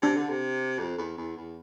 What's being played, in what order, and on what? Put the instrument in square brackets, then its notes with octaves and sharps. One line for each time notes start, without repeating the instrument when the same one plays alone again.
[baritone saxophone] C3 [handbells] D4
[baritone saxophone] D3
C3
F2
E2
E2
E2